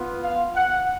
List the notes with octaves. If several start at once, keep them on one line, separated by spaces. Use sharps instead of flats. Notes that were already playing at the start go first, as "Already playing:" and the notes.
Already playing: B3 F4
F5
F#5